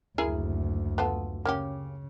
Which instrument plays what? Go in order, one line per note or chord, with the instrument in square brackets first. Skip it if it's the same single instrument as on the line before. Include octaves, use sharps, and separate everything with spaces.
[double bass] F#1 D2 [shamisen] E4 G#4 A#4
[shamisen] B3 F4 A4
[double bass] C#3 [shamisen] A#3 C#4 G4